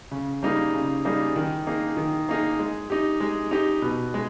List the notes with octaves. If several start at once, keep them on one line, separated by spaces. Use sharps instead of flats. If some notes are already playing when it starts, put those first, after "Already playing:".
C#3
G3 A#3 D#4 G#4
C#3
G3 A#3 D#4 G#4
D#3
A#3 D#4 G#4
D#3
A#3 D#4 G#4
G#3
D#4 G4
G#3
D#4 G4
B2
G#3